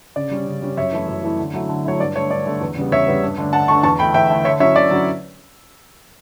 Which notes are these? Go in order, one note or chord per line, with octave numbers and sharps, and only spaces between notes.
C#3 D5
G3 C#4
C#3
G3 C#4
F#2 C#5 E5
E3 A3 E4
F#2
E3 A3 E4
D3
F#3 A3 E4
D3
F#3 A3 E4 C#5
G2 D5
D3 A3 C#5
G2 D5
D3 A3
E2
C#3 G3 B3
E2 C#5 E5
C#3 G3 B3
G2
D3 A3 D4
G2 F#5 A5
D3 A3 D4 A5 C#6
E2 A5 C#6
D3 A3 E4 G5 B5
E2 E5 G5
D3 A3 E4
D3 C#5 E5
F#3 C#4 E4 C#5 E5
D3 D5
F#3 C#4 E4